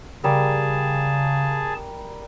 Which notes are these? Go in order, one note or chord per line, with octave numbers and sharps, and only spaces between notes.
C#3 G3 G#4 A#4 A5